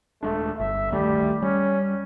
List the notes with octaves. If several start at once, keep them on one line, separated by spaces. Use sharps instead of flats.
D#1 G#3 A3 D4
G1 E5
D2 D#3 G3 A3
G3 C#4